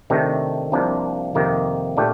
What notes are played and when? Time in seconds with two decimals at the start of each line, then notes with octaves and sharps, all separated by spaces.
0.10 C3 D#3 A3 D4 A4
0.72 C2 C3 F3 A#3 D4
1.34 F2 C3 D#3 A#3
1.97 A#2 A3 D4 G4